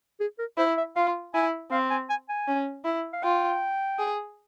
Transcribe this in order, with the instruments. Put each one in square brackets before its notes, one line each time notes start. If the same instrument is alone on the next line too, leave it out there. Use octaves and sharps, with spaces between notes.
[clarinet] G#4
A#4
[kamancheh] E4 [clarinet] C5
[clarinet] E5
[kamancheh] F4 [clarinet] F5
[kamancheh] E4 [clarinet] G#5
[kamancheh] C4 [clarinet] F5
[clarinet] G#5
G#5
G#5
[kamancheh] C#4
E4
[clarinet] F5
[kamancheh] F4 [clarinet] G5
[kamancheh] G#4